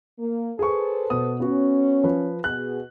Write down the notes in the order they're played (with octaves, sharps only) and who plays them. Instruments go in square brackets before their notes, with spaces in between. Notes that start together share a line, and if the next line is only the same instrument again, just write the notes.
[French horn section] A#3
[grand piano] G#4 C#6 [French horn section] A4 B4 C5
[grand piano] B2 D#6
[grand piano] B3 F#4 [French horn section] C#4
[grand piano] F3 B4
[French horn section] B2 G#4 [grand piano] F#6